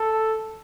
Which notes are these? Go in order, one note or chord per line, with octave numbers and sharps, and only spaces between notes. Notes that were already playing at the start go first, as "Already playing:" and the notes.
Already playing: A4